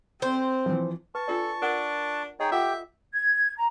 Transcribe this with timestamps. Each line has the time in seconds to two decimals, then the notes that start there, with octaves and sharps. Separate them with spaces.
0.22 C4 C5
0.66 E3 F3
1.15 B4 A5 C#6
1.28 D4 F4 A4 D5
1.62 D4 A#4 D5 F#5
2.40 D#4 G#4 C#5 D#5 G5
2.52 F4 G4 A4 E5 F#5 G5
3.13 G#6
3.57 A#5